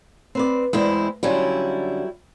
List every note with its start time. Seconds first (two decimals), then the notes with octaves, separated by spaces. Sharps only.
0.35 C4 B4 D5
0.73 E2 G#3 C4 E4
1.23 D3 F#3 G3 C#4 E4 F4